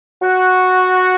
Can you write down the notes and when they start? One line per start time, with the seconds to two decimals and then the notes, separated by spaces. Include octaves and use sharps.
0.22 F#4